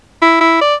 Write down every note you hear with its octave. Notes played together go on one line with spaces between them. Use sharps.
E4
E4
D5